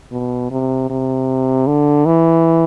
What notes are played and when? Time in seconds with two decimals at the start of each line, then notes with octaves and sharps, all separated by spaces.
0.12 B2
0.51 C3
0.90 C3
1.67 D3
2.06 E3